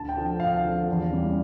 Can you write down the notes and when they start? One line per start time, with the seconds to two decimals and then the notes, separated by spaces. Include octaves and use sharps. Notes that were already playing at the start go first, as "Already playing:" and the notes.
Already playing: D2 A5
0.09 G5
0.17 D3 F3
0.40 D2 F5
0.64 D3 F3
0.89 E2
1.12 C#3 E3 G3